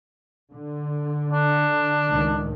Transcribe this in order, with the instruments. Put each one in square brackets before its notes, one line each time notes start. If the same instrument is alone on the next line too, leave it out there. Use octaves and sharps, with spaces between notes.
[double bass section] D3
[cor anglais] D4
[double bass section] C#2 A2 D#3